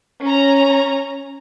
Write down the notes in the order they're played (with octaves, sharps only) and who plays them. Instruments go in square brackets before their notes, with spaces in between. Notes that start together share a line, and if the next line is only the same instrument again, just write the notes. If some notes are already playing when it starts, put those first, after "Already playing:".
[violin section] C#4 A#5